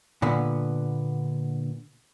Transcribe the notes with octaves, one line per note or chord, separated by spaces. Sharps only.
A#2 D3 B3